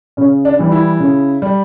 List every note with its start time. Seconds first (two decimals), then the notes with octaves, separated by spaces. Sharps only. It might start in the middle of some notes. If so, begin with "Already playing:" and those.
0.17 C#3 C#4
0.45 D4
0.59 E3 G3
0.72 E4
1.00 C#3
1.42 G3